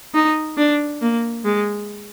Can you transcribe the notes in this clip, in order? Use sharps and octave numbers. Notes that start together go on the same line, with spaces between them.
D#4
D4
A#3
G#3